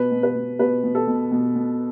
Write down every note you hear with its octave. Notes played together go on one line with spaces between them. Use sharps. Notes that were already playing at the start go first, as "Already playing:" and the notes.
Already playing: B2 B4
B2
B4
B2
B2 B4
B2
A4
B2
B2
B2